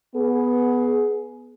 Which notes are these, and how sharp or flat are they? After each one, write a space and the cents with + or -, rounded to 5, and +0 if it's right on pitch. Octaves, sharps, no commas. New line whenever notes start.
B3 +0 G#4 +20